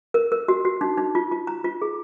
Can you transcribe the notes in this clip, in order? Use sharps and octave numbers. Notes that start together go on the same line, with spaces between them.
A#4
A#4
F#4
F#4
D#4
D#4
F4
F4
A#5
F4
G#4